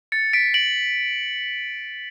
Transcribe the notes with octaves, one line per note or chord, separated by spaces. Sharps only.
A6 C#7
B6 D7
D7 F#7